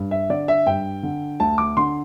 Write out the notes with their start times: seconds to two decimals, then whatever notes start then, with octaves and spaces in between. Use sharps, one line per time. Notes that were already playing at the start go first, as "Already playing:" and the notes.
Already playing: G2
0.11 E5
0.30 D3 D5
0.48 E5
0.66 G2 G5
1.03 D3
1.40 D2 A5
1.58 D6
1.77 D3 C6